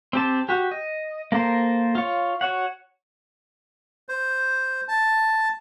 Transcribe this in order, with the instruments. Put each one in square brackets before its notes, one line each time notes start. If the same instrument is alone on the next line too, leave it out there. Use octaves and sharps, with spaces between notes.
[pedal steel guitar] C4 G4 A5
F#4 G4
D#5
A#3 A4 A#4 C5
F4 C#5
F#4 C#5 F#5
[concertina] C5
A5